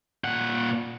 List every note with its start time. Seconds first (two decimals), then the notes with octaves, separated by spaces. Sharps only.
0.24 A#2 F#5